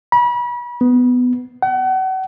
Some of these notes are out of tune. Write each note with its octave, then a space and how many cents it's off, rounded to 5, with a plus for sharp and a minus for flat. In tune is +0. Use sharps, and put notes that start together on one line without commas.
B5 -35
B3 +10
F#5 +35